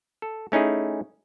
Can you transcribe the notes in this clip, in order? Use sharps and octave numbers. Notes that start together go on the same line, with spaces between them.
A4
A3 C#4 D#4 E4 G#4